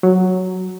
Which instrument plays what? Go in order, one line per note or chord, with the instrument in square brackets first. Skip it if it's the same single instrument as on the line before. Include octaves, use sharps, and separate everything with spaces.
[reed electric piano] F#3